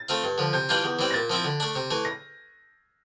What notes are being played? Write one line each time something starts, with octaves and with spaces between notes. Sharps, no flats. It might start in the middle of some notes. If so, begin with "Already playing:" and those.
Already playing: A6
A3 C4 F4
G2
D3 F3
C3 G6
E3 G3 D4 F4 G6
E2
E3 G3 C4
A#6
A#2 A6
F3 C4 E4
D3
A3 D4
C3
E3 A3
A#6